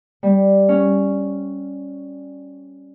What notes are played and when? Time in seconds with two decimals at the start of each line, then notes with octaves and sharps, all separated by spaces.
0.23 G3
0.69 C#4